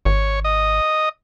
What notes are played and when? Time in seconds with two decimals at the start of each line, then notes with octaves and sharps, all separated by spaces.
0.05 G#1 C#5
0.44 D#5